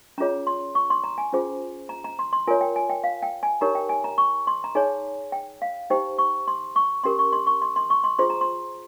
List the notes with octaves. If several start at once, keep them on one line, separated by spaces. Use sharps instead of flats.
C#4 F4 G#4 C#5 A#5
C6
C#6
C6
A#5
G#5
C#4 F4 G#4 C5
A#5
A#5
C6
C6
F4 A#4 C#5 G#5
G5
G#5
G5
F5
G5
G#5
D#4 G4 A#4 C#5 A#5
G5
G#5
A#5
C#6
C6
A#5
D#4 G#4 C#5 G#5
G5
F5
D#4 G4 C5 G5
C#6
C6
C#6
C#4 G4 A#4 C6
C#6
C6
C#6
C6
C6
C#6
C6
F4 G#4 C5 C6
A#5
C6